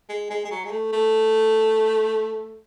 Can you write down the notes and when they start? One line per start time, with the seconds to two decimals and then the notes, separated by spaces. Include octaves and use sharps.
0.09 G#3
0.30 G#3
0.45 G#3
0.51 F#3
0.65 G#3
0.72 A3
0.93 A3